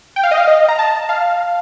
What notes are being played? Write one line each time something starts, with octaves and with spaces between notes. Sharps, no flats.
G5
F5
D#5
F5
D#5
A#5
A5
F5